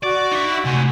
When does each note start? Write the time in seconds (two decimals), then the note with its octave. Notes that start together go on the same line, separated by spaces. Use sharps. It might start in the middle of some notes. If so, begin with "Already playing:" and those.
0.03 F#4 D5 C#6
0.32 D#4 E5
0.65 C3 A3 F#5 G#5 C6